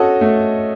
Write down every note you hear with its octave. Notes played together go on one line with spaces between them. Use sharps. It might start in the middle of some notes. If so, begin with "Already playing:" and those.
Already playing: C#4 F#4 A4 D#5
A3